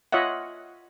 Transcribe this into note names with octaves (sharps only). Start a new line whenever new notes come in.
F4 C#5 D#5 E5 F#5